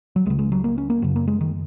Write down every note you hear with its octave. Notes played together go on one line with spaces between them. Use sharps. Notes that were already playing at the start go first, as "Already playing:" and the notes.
F#3
C#2 C#3 G#3
G#3
F#3
A#3
C#4
A#3
F#2 C#3 F#3
A#3
G#3
D#3